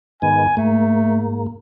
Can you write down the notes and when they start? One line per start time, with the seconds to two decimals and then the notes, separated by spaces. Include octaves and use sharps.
0.22 G#2 D#3 B3 G#5
0.57 G#2 A3 A#3